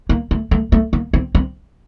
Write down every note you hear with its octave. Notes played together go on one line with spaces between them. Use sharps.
A#3
A3
A3
A3
A#3
C4
C4